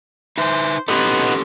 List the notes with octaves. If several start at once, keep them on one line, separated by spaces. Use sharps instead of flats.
D#4 B4 C5 E5
B3 C#4 D#4 G4 A4 C6